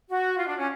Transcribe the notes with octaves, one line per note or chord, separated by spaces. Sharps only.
F#4
F4
D4
C#4